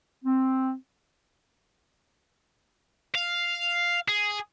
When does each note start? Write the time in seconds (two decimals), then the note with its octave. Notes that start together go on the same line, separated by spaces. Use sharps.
0.25 C4
3.15 F5
4.08 G#4